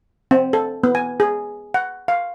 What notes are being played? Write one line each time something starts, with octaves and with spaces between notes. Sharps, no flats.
C4
A4
B3
G#5
G#4
F#5
F5